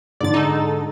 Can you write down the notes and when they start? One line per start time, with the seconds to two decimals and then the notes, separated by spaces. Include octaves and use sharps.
0.21 G#2 D3 D5 A6
0.34 D#4 A4